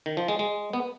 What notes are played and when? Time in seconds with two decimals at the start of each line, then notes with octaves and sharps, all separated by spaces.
0.06 D#3
0.17 F3
0.28 G#3
0.39 G#3
0.73 B3